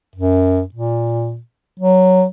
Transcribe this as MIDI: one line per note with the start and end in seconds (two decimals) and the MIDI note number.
0.15 0.62 42
0.74 1.38 46
1.80 2.25 54